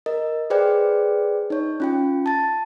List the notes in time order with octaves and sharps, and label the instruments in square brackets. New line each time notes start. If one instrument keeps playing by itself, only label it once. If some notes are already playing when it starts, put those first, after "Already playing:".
[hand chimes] A#4 D#5
G#4 B4 C5 D5 G5
D#4 C#5
C#4 F4 G5
A5 A6